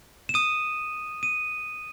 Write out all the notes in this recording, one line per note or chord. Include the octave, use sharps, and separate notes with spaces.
E7
D#6 D#7
D#7